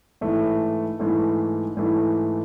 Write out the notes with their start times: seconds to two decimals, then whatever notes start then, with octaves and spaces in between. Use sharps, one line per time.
0.21 G#2 E3 A3
0.99 G#2 E3 A3
1.77 G#2 E3 A3